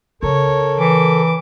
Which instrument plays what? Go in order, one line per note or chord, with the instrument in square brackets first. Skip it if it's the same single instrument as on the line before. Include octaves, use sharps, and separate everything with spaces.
[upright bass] C#3 [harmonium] A4 A#4 [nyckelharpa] C#5
[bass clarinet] E3 [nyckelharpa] D6